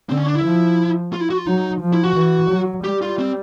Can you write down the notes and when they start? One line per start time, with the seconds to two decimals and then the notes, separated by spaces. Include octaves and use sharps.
0.09 D3 C4
0.17 C#4
0.26 D4
0.35 E4
0.43 F3
1.13 F4
1.20 E4
1.30 F#4
1.38 F4
1.46 F#3 D#4
1.81 F3
1.93 E4
2.04 F#4
2.15 E3
2.50 F#3
2.84 G3 G4
3.02 F4
3.19 C4